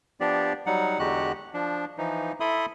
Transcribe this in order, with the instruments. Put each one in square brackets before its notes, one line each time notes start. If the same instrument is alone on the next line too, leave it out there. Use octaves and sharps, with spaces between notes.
[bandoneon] F3 B3 D4 G4 D5
F#3 G3 D#4 F#5
E2 D3 G#3 F#4 G4 F#6
F3 D4
E3 F3 D#4
E4 A4 E5 B5 C6 D#6